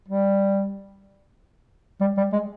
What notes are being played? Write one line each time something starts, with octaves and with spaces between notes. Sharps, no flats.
G3
G3
G3
G#3